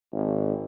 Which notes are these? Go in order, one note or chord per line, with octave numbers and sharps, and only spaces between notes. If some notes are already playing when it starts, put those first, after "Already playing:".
G#1